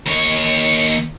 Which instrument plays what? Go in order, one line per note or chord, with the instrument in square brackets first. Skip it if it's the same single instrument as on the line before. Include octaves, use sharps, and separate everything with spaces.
[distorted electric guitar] D#2 C#5